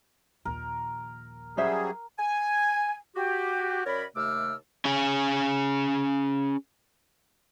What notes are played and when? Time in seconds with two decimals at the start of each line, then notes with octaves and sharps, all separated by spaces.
0.45 A#1 D#2 A#4
1.57 F#3 G3 C#4 G#4 C5 E5
2.18 G#5
3.16 F#4 G4
3.86 F#2 A#4 C#5 D5 B5
4.16 D#2 C3 A3 D6 E6 F6
4.85 C#4 G#4